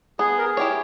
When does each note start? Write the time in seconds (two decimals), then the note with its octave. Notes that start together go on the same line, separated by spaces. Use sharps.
0.19 B3 G#4
0.38 A#4
0.45 G#4
0.57 E4 G4 C#5